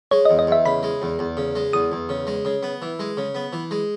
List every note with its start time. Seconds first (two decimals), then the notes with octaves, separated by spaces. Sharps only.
0.11 G#3 C#5
0.25 E2 D#5
0.39 D#5
0.47 E2 E5
0.66 C#3 B5
0.83 G#3
1.02 E2
1.19 E2
1.37 C#3
1.56 G#3
1.73 E2 D#6
1.92 E2
2.09 C#3
2.27 G#3
2.45 C#3
2.63 B3
2.82 E3
2.99 G#3
3.17 C#3
3.35 B3
3.53 E3
3.71 G#3